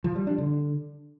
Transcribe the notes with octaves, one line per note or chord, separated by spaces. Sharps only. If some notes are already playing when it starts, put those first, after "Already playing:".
F3
G3
D4
D3